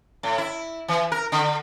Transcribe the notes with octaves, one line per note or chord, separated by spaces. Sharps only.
A2
E4
E3
A#4
D3